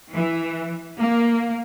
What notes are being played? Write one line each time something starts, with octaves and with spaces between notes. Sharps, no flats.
E3
A#3